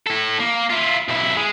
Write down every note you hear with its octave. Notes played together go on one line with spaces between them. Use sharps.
E4 A4
A#3
E4 F4
B1 E4
G#3